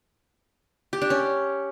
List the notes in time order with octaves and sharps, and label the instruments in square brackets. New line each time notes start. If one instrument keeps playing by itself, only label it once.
[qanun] G4
D4
C#4